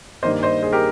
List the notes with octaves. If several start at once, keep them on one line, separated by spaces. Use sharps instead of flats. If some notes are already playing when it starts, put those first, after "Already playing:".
G2 D#3 A#3 C5 D#5
C5 D#5
G#4 C5
G4 A#4